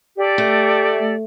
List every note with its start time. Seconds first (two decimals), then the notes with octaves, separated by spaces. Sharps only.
0.17 G4 A4 D5
0.38 A3